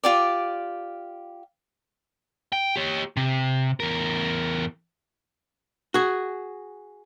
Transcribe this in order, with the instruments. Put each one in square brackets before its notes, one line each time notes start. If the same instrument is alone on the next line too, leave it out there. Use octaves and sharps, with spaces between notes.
[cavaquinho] F4 G4 D5
[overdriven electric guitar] G5
G4 C#5
C3
E2 A#4
[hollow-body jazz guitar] F#4 G#4